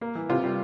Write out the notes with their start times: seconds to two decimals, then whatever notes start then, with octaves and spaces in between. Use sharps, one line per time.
0.01 A#3
0.15 E3
0.29 C3 F4
0.44 G3